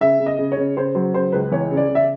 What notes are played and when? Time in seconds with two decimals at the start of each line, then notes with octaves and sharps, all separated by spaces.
0.01 C#3 E5
0.20 C#3
0.26 D#5
0.39 C#3
0.52 C#5
0.57 C#3
0.77 C#3 C5
0.95 F#3 C5
1.14 C#3 C5
1.32 C#2 B4
1.51 E3 C#5
1.71 C#3
1.77 D5
1.89 C#3
1.95 E5